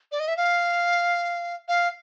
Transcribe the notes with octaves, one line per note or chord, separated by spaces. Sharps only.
D5
D#5
E5
F5
F5